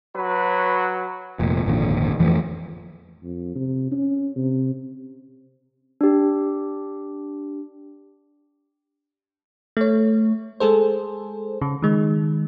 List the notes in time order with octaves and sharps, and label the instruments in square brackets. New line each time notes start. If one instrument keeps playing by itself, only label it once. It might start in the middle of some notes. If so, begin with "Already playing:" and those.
[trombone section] F#3 B4
[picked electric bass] F1 A#2
G#1 F2 A#2 D3
F2 E3 F3 A3
[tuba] F2
C3
C#4
C3
[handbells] D4 G4
[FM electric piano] A3 C#5
G#3 G#4 A4 C5
C#3
D#3 G#3